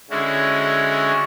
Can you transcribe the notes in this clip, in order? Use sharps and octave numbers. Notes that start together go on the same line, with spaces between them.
D3 G#3 C#4 E4 F#4